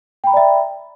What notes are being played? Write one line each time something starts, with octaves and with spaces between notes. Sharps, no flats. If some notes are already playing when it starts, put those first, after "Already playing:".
D5 E5 G5 A#5 B5